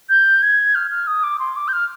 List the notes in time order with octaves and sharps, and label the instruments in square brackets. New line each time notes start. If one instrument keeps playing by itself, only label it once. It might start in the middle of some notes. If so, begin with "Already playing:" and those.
[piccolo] G6
G#6
F6
F6
D#6
D6
C6
D6
G6
F6